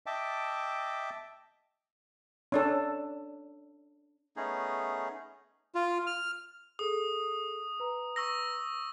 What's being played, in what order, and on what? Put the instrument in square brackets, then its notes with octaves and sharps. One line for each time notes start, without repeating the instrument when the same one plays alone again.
[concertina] D#5 E5 G5 A5 D6
[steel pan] C#4 D4 A4
[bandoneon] A3 B3 C#4 D#4 G#4
F4
F6
[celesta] G#4 A4 [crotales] D#6
[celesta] B4 A#5
[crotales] C#6 E6 A#6